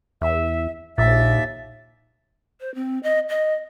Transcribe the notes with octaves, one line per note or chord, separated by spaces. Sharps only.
E2 E5
A#1 D#2 A#2 E5 A6
C5
C4
D#5
D#5